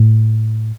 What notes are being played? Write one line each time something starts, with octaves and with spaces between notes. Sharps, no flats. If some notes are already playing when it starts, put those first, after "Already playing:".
Already playing: A2